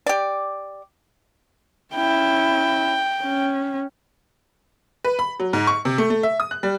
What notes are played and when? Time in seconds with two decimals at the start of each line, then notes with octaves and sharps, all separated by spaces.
0.06 G4 D5
1.95 C#4 E4 G5
3.23 C#4
5.04 B4
5.19 B5
5.40 F#3
5.53 G#2
5.67 C#6
5.85 C3
5.98 A3
6.10 A3
6.23 E5
6.40 D#6
6.51 F#6
6.63 G3